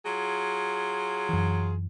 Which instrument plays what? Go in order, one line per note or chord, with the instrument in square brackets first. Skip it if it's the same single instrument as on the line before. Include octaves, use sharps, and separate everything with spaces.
[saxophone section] F#3 F4 G#4
[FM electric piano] F#2 E3